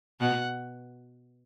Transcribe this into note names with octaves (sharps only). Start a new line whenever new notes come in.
B2 F#5